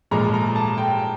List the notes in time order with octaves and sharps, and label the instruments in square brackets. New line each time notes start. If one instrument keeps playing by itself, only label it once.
[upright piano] A#2 F3 G#3 A#5
A#5
A5
G5